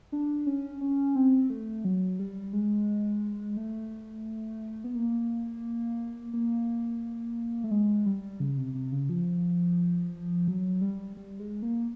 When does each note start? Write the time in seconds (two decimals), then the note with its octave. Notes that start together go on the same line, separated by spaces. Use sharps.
0.12 D4
0.47 C#4
0.81 C#4
1.16 C4
1.50 A3
1.85 F#3
2.19 G3
2.53 G#3
3.57 A3
4.84 B3
4.95 A#3
6.33 A#3
7.64 A3
7.71 G#3
8.06 G3
8.40 C#3
8.57 C3
8.75 C3
8.92 C#3
9.09 F3
10.48 F#3
10.82 G3
11.17 G3
11.40 G#3
11.62 A#3